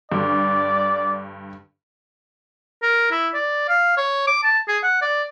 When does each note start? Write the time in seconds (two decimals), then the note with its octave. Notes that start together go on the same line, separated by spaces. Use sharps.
0.12 G2 D3 D5
2.83 A#4
3.12 E4
3.34 D5
3.69 F5
3.98 C#5
4.27 D6
4.43 A5
4.68 G#4
4.84 F#5
5.02 D5